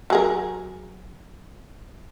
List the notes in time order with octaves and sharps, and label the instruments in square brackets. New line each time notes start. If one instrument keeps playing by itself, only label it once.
[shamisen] F#3 G#4 A#4